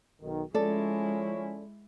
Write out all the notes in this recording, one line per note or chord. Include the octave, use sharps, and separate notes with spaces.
B1 D#3
F3 G#3 C#4 E4 A4 D5